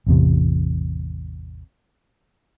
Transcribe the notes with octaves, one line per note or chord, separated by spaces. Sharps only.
A1 E2 C3